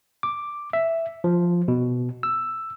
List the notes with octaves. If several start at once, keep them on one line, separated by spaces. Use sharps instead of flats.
D6
E5
F3
B2
E6